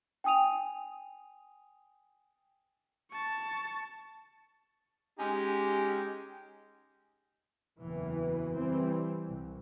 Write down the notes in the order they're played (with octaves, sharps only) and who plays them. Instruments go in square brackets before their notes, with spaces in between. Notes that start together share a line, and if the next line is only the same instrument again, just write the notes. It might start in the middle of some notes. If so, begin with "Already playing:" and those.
[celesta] G5 G#5 D#6 D#7 F7
[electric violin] A5 C#6
[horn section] G#3 C#4 D#4 G4
[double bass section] F#1 E2 E3
E3 G3 C4
C2